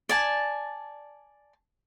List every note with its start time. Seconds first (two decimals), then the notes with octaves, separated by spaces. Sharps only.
0.09 D5 G#5 A5